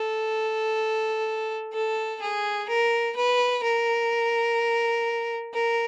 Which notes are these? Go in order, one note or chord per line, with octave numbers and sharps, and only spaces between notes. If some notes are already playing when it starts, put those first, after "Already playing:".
Already playing: A4
A4
G#4
A#4
B4
A#4
A#4